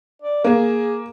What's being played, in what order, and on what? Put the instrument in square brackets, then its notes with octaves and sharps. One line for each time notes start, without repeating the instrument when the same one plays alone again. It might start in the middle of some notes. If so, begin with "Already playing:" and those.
[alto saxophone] D5
[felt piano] A#3 [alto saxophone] G#4